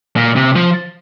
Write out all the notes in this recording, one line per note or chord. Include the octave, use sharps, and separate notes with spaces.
A#2
C3
F3